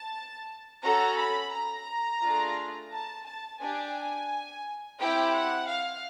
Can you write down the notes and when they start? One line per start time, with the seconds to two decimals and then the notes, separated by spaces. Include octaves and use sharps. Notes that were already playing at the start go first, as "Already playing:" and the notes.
Already playing: A5
0.82 C#4 F#4 A4 A#5
1.17 B5
1.52 A#5
2.21 A3 D4 F4 G#4
2.91 A5
3.26 A5
3.60 D4 G4 G#5
4.99 C4 E4 G4 G5
5.34 F#5
5.68 F5